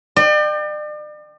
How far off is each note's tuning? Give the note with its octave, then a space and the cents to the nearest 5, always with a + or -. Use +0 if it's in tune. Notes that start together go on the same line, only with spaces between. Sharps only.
D5 +40 G5 +0